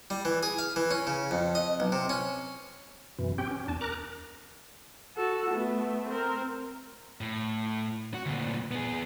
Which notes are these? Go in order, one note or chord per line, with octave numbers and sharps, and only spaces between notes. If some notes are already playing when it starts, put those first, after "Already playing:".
G3
E3
G#4
F5
E3
C#4
C#3
F2
D#5
B1
C3
C#4
F#2 B2 E3
C4 C#4 G4 G5
C#4
E2 D4 A5
A#4 A#5 D6 F#6
F#4 A4
A3 B3
C4 A#4
A2
F#4
D2 A#2
B3 G#4